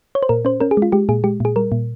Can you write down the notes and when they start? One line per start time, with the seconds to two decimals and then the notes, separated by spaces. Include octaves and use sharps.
0.15 C#5
0.23 C5
0.29 A#2 A#4
0.45 C#4 C5
0.60 C#4 A#4
0.71 G#4
0.77 G#3
0.82 F4
0.92 G#3 G4
1.09 A#2 G#4
1.24 G#3 G4
1.40 A#2 G#4
1.56 G3 A#4
1.72 A#2